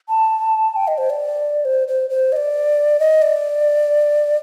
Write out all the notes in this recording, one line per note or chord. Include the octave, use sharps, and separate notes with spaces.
A5
G5
D#5
C5
D5
C5
C5
C5
D#5
D5
D#5
D5